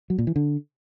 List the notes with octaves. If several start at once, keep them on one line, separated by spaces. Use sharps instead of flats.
F#3
A#2
E3
D3